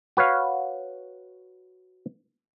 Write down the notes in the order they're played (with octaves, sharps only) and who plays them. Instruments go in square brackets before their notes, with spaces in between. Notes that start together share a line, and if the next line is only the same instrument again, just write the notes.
[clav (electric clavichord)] F#4 B4 C#5 F5